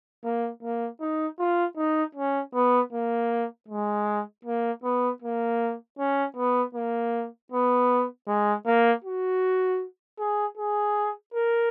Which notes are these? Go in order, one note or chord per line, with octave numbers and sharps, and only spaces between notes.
A#3
A#3
D#4
F4
D#4
C#4
B3
A#3
G#3
A#3
B3
A#3
C#4
B3
A#3
B3
G#3
A#3
F#4
G#4
G#4
A#4